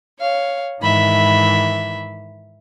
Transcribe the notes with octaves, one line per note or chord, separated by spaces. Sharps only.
C#5 F5
G#2 D#3 E3 E5 B5